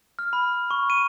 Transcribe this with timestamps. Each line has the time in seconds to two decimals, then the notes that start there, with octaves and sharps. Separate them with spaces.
0.19 F6
0.33 B5
0.71 C#6
0.90 D#7